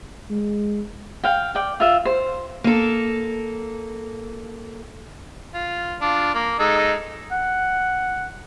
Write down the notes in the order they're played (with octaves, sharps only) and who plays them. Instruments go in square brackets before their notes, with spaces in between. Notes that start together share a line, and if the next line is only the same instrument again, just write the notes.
[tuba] G#3
[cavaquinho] F5 G5
D5 G5
F4 E5
C5
[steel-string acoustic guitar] A#3 A4
[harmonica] F4
D4 F4
A#3
G#3 D#4 A4
[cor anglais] F#5